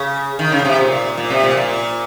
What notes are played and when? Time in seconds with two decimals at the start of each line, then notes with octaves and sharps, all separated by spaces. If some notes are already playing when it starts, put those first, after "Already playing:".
Already playing: C#3
0.39 D#3
0.52 C#3
0.65 C3
0.78 A#2
1.17 A#2
1.30 C3
1.43 A#2
1.57 A#2